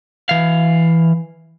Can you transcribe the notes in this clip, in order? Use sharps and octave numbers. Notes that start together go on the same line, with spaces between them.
E3 F5